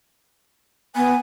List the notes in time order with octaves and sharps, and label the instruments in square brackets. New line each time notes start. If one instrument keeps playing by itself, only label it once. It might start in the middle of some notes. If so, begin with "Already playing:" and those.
[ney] B3 [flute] G#5